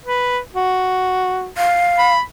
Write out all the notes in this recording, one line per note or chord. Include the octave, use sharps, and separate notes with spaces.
B4
F#4
F5
B5